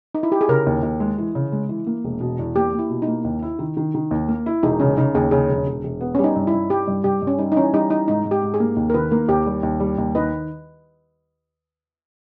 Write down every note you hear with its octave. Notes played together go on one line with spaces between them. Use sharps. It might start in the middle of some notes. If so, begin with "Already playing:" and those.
D#4
E4
G4
G#4
C#3 A#4
D#2
D#2
G#3
E3
C#3
G#3
E3
A#3
E1
B2
E2
A#3 G4
A#3
E4
B2
D#4
A#3
D#2
E4
D#3
D#3
D#3
D#2
A#3
E4
E1 D#4
C#3 C#4
C#3 D#4
D#2 G#4
C#3 G#4
E1
E1
E1
B3
G3 C#4
D#4
G2
E4
G2
G3 G4
G2
G2 G4
G2
C#4
G3 D#4
D#4
E3 C#4
G3 D#4
E3 D#4
G#2 D#4
G#2
G4
G#2
G#4
A#3
D#2
A#4
D#3 B4
A#3 A#4
D#2 G4
G3
D#2
G3
D#2
D#3 B4 D#5